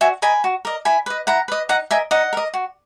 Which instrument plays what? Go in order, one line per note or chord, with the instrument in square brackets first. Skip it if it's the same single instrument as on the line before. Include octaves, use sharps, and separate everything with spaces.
[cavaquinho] F#4 E5 G#5
A#4 D#5 G#5 B5
F#4
A#4 D#5
E4 G#5 B5
B4 D#5
E4 F#5 A#5
B4 D#5
D#4 F#5 A#5
A#4 D#5 E5 G#5
D#4 D#5 F#5
A#4 D#5
F#4